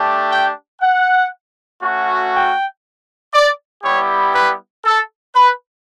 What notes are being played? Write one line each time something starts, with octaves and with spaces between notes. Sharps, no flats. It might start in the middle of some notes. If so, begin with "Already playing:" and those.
Already playing: A3 D4 G4
G5
F#5
A3 C#4 F#4
G5
D5
G3 B3 E4 G4 C#5
B4
A4
B4